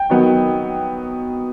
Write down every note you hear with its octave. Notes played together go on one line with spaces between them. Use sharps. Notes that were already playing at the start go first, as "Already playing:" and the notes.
Already playing: G5
D#3 F#3 B3